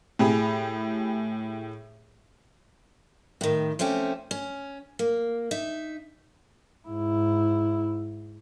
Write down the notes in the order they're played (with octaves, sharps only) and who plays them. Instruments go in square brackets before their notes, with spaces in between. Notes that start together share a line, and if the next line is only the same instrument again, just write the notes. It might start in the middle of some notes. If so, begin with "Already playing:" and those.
[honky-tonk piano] A2 G4 G#4 B5
[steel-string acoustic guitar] A2 D#3
F3 A3 C4 C#4 G4
C#4
A#3
D#4 E5
[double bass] G#2 E4